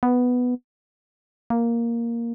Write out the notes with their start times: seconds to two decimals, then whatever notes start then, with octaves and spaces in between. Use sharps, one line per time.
0.03 B3
1.50 A#3